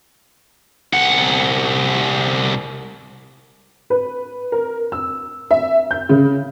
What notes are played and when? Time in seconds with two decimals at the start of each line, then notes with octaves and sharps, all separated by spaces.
0.93 C2 F#5
3.90 B4
4.52 A#4
4.92 E6
5.51 E5
5.91 G6
6.09 C#3